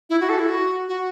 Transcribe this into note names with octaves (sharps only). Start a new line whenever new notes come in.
E4
F#4
A4
E4
F#4
F#4